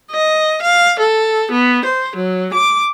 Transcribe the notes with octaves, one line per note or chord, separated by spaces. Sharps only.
D#5
F5
A4
B3
C5
F#3
D6